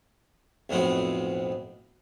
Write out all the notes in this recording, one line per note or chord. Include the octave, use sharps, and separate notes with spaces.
B1 F2 A2 B3 C4 F#4